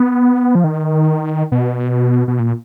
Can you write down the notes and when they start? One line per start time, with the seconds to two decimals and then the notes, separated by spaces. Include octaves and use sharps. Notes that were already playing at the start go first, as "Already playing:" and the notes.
Already playing: B3
0.55 F3
0.64 D#3
1.52 B2
2.28 B2
2.40 A#2